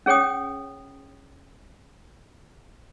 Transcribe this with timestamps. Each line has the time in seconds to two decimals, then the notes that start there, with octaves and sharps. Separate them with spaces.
0.06 C#4 G#4 C#5 G5 D#6